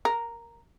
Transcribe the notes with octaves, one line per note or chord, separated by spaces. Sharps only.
A#4